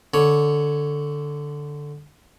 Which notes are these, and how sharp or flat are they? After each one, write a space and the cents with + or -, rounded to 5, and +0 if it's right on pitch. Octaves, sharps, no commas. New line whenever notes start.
D3 +0 C#5 +5